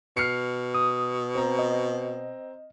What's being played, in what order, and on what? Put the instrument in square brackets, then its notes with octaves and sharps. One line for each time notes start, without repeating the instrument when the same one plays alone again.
[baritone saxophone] B2 [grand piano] F6 C7 C#7
[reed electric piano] D#6
[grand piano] C4 A#5
[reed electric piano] D#5